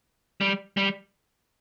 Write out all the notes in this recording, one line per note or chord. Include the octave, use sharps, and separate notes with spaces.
G3
G3